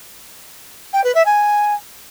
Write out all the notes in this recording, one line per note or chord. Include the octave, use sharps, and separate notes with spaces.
G5
B4
E5
G#5